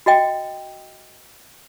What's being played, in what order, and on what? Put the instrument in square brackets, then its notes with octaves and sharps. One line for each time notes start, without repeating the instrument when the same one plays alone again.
[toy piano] F#4 D#5 G5